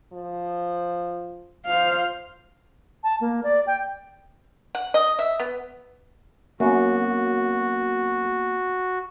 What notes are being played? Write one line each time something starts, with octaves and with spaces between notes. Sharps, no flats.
F3
F3 C5 F5
A5
A#3
D5
G5
F#5
D#5
E5
B3
F#2 A#3 B3 F#4